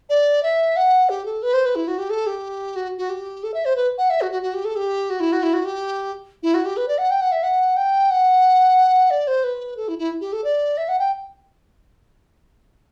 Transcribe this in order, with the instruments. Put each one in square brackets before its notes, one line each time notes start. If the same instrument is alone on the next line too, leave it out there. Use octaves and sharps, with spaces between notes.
[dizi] D5
E5
F#5
G4
A4
B4
C5
B4
E4
F#4
G4
A4
G4
F#4
F#4
G4
A4
E5
C5
B4
F#5
E5
F#4
F#4
F#4
G4
A4
G4
F#4
E4
F#4
E4
F#4
G4
E4
F#4
G4
B4
D5
F#5
G5
F#5
E5
F#5
G5
F#5
D5
C5
B4
A4
E4
E4
G4
A4
D5
E5
F#5
G5